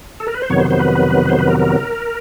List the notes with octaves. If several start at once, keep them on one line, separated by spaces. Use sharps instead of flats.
A4
A#4
B4
C5
F2 C3 D#3 F#3 B3 C#5
C5
C5
B4
C5
B4
A#4
A#4